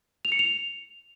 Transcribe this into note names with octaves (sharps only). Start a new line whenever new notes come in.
F7
C#7
F7